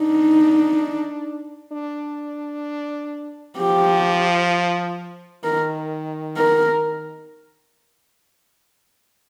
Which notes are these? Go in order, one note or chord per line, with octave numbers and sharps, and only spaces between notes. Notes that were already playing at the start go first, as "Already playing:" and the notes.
Already playing: D4 D#4
D4
F3 G4
D#3 A#4
A#4